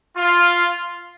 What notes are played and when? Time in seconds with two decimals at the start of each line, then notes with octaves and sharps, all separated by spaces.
0.17 F4